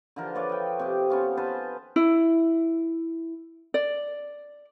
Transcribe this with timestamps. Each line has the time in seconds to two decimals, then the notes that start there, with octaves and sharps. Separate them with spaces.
0.16 D3 E3 F3 A#4
0.35 B4 C#5 D5 F5
0.49 D#5 G5
0.79 C3 G4
1.10 B3 C#4 F4
1.37 B4 C5 G#5 A5
1.96 E4
3.74 D5